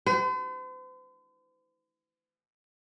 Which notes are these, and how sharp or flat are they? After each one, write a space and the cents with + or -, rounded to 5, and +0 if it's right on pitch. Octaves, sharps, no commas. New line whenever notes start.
C5 -45